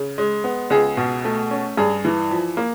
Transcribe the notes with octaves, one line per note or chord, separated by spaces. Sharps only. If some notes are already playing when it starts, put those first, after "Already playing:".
Already playing: C#3
G#3
B3
C#2 G#4
B2
A3
C#4
G2 G#4
E3
F3
A#3